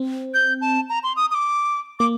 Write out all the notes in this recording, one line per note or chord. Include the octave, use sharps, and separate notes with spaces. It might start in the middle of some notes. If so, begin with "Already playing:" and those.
Already playing: C4
G6
A5
A#5
C6
D#6
D#6
D6
A#3 D6